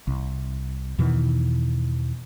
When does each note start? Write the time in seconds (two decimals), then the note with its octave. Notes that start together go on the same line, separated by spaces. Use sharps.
0.07 C2
0.98 E2 B2 D#3 E3